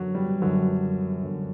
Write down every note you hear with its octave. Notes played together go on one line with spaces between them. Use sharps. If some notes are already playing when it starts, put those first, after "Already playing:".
Already playing: F#2 D3 F#3
G3
F#2 D3 F#3
F#2 D3